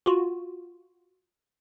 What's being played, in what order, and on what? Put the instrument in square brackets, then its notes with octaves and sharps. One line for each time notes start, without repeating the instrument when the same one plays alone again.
[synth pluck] F4 F#4